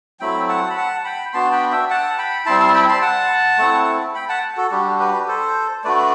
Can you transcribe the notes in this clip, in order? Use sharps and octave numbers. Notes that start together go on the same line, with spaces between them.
F#3 A3 C4 E4 G5 B5
F#5 A5
B5
F#5 A5
G5 B5
B3 D4 F#4 A5 C6
G5 B5
E5 G5
F#5 A5
G5 B5
G3 C4 E4 A5 C6
A5 C6
G5 B5
A5 C6
F#5 A5
A3 C4 E4
G5 B5
F#5 A5
F#4 A4
G3 D4 F#4 G4
G4 B4
A4 C5
A3 D4 F#4 B4 D5